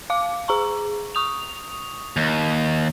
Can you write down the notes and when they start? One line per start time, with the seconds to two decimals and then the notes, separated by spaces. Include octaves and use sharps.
0.10 F5 D6
0.48 G#4 A#5 C#6
1.15 C#6 D#6 F7
2.17 D#2